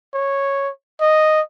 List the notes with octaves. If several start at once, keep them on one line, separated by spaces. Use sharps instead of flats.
C#5
D#5